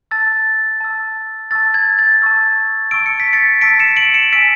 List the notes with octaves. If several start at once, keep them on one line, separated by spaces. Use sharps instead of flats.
A5 E6 A6
A5 E6
A5 C#6 E6 A6
G#6
A6
A5 C#6 E6
A5 C#6 E6 D7
C#7
B6
A6 C#7
A5 C#6 E6 B6 D7
C#7 E7
D7 F#7
C#7 E7
G#5 C#6 E6 B6 D7